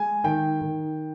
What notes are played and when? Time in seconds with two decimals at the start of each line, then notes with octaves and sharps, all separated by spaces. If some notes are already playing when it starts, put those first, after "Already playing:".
Already playing: G#3 G#5
0.24 D#3 G5
0.61 D#3